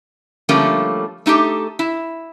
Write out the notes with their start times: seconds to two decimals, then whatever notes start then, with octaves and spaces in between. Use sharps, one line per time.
0.49 D3 F3 G3 A3 A#3 C#4
1.26 A3 D#4 F4 G4 A4
1.79 E4